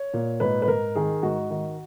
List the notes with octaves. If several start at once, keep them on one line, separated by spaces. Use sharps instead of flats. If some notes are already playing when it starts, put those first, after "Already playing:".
Already playing: C#5
A#2
G#2 B4
B4
G#2 A#4
D#3 G#4
G#2 F#4
D#3